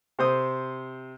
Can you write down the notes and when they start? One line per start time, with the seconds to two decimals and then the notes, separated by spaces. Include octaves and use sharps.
0.19 C3 C5 D#6